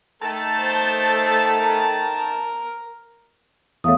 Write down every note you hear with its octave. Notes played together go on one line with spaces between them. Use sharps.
D#3 A3 A4 A5
C5
A#4
E2 A3 C#5 F5 D#6